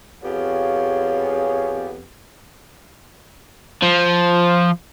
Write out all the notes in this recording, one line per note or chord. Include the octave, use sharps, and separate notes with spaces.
F2 B3 G4 G#4 C#5 F5
F3